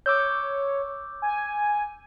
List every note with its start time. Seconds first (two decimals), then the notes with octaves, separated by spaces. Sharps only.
0.06 C#5 D6 E6 G6
1.22 G#5